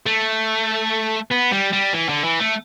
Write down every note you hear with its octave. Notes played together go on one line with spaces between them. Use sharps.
A3
B3
G3
G3
E3
D3
E3
A3